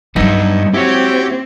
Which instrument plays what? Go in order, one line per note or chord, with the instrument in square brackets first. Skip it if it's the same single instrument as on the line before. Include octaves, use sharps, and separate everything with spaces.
[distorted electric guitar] G2 [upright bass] F#3 G#3 [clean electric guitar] B3 D#4 E4
[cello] C4 [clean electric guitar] E4 F#4 C#5 [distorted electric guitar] G4